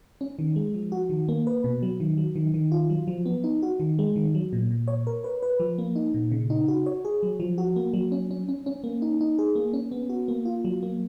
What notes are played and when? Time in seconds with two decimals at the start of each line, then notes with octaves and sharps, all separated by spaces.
0.21 C#4
0.39 D#3
0.56 G#3
0.74 F3
0.92 F#4
1.10 D#3
1.29 A#3
1.47 B4
1.64 B2
1.83 F#3
2.00 D#3
2.18 F#3
2.36 D#3
2.54 D#3
2.72 F4
2.90 F#3
3.08 F3
3.26 B3
3.44 D#4
3.63 F#4
3.80 D#3
3.99 G#3
4.16 D#3
4.35 F#3
4.53 A#2
4.71 A#2
4.88 C#5
5.07 A#4
5.24 B4
5.43 B4
5.60 F3
5.78 A#3
5.96 D#4
6.14 A#2
6.32 C#3
6.50 D#4
6.68 F#4
6.86 C#5
7.05 G#4
7.23 F#3
7.40 F3
7.58 F#4
7.76 A#3
7.94 F#3
8.12 C#4
8.31 C#4
8.49 C#4
8.66 C#4
8.84 A#3
9.02 D#4
9.21 D#4
9.39 G#4
9.55 A#3
9.73 C#4
9.91 B3
10.09 F#4
10.28 A#3
10.45 F4
10.65 F#3
10.83 A#3